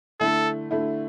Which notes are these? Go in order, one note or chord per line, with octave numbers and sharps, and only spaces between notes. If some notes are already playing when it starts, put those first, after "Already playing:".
D3 A3 E4 A4
D3 A3 E4